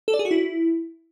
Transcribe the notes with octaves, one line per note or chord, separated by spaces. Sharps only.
A4
D5
G#4
F#4
E4